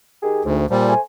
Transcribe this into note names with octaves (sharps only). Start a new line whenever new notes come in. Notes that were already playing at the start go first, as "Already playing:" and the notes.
D#3 G4 G#4
D2 G#2
A#2 F3 G3
A3 C5 G#5